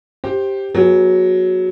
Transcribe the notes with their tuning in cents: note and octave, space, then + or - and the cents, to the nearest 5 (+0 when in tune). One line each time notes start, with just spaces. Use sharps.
G4 +0 C5 +15
F#3 +0 B3 -40 G#4 +0